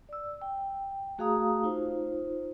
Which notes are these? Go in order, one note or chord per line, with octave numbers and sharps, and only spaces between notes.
D5 E6
G5
A3 F#4 G#4 F5 A#5 D#6
D#4 F4 C5